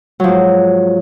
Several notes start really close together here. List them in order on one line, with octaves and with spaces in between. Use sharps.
F#3 F3 G#2